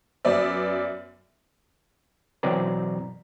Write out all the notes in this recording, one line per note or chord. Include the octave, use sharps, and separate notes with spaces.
F#2 B3 D5 E5
B2 E3 F#3 C4 D5 A#5